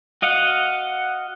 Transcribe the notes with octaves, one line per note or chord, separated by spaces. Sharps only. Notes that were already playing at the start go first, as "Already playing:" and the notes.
F#4 D#5 F5 F#5